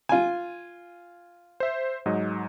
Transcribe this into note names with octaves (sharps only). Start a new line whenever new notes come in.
F4 G#5
C5 E5
G#2 F#3 D#5